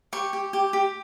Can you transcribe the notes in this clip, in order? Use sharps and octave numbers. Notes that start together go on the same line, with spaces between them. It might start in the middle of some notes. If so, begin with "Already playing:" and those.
G4 C#6
G4
G4
G4